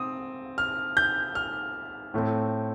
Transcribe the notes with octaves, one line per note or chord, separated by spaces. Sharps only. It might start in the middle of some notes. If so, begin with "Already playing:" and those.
Already playing: C4 D#6
F6
G6
F6
A2 A3 C4